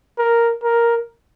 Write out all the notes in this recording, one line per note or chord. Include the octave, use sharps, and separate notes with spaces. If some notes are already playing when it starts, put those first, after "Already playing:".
A#4
A#4